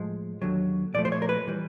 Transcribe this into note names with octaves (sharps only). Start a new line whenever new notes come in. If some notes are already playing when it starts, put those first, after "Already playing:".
Already playing: A2 F3 G#3
D#2 D3 F#3
A#2 F3 A3 D5
C5
C#5
A#4
B4
E3 G3